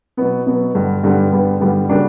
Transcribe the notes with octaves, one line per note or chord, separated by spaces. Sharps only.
B2 F#3 B3
B2 F#3 B3
G2 D3 G3 B3
G2 D3 G3 B3
G2 D3 G3 B3
G2 D3 G3 B3
C#3 G3 A#3 D4 F#4